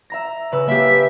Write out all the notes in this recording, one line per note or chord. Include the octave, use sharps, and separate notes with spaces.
E5 A#5 A#6
C#3 B4 E6
A#3 G4 E5